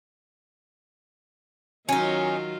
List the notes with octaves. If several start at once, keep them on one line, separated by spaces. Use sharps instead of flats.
D#3 F#3 C#4 D#4 F4